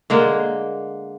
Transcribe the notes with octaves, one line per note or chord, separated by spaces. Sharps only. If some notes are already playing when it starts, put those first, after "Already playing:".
D3 G#3 A#3